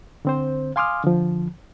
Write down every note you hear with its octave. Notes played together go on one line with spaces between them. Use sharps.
D3 C4 C5
F5 G#5 C6 D6 D#6 F6
D3 F3